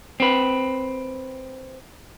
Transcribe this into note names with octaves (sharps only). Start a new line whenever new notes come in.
C4 B4